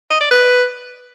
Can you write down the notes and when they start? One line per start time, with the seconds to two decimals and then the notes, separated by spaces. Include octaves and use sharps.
0.10 D#5
0.21 D5
0.31 B4